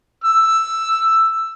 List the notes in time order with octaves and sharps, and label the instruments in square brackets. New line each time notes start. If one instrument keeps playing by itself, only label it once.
[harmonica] E6